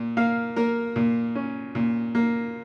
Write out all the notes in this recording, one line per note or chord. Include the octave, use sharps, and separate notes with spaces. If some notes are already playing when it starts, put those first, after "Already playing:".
Already playing: A#2
A#3 F5
A#3 A#4
A#2
C#4
A#2
A#3